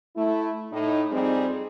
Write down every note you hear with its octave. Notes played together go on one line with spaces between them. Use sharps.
A3 E4
A2 D#4
F2 G3 C4 D#4 G#4